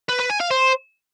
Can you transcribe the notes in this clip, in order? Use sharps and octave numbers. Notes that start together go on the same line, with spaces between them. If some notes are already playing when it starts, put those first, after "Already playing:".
B4
B4
G#5
F5
C5